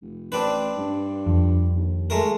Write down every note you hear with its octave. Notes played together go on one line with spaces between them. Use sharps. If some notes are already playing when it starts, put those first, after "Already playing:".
F1
A1 C4 D4 B4
G2
F2
D#2
G#3 A3 A#4